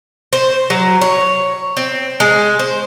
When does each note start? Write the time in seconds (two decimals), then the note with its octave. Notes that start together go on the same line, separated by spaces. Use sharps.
0.33 C5
0.70 F#3
1.01 C#5
1.77 C4
2.20 G#3
2.59 C5